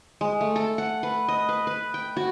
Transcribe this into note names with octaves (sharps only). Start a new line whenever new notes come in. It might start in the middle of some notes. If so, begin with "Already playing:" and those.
G#3
A3
A4
F#5
B4
D#5
B4
B4
G5
F#4